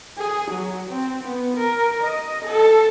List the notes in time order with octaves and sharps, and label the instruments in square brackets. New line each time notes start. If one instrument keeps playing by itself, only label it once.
[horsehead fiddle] G#4
F#3
C4
B3
A#4
D#5
A4